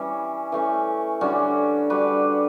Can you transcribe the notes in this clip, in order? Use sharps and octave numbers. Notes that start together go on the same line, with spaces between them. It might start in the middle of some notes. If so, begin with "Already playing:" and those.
Already playing: E3 G3 C#4
E3 A3 C#4
D3 G3 C#4 F#4
G3 D4 F#4 B4